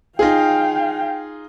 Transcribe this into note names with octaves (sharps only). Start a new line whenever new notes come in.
D#4 F4 G#4 F5 G5